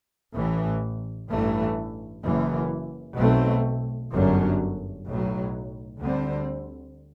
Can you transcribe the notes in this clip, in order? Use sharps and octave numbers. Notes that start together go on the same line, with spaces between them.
A1 A2 E3
A1 G2 E3 A3
F#1 F#2 E3
B1 B2 A3 C4
G1 F#2 D3 F#3
B1 A2 F#3
D2 D3 G3 C4